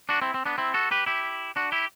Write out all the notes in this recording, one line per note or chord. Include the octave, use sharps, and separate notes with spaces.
D4 F#4
C4 E4
C4
B3 D4
C4 E4
F#4 A4
G4 B4
E4 G4
D4 F#4
E4 G4